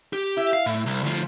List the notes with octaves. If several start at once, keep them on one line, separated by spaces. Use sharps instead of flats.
G4
E4 E5
F5
A2
C2
D2 F3